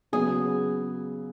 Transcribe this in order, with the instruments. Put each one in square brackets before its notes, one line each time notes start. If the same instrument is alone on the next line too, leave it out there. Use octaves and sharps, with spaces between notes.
[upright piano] C#3 F#3 B3 [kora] G#4